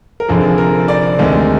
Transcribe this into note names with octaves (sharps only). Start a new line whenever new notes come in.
A#4
F1 F2 D3 F3 G#4
A#4
D5
D2 C3 D#3 G#3